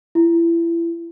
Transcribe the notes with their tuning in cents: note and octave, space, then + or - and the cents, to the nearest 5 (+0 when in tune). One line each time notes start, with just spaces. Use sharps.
E4 +30